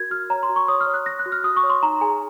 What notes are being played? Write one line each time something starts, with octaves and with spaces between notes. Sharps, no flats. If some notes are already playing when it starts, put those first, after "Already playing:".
Already playing: F#4 A#4 G#6
F#4 F6
C#5 A#5
C6
F#4
C#6
C#5 D#6
F6
C#5
F#6
C#5 A#6
F#6
F#4
F6
F#4 D#6
C#6
C#5
C6
D#4 A#5
G#4 G#5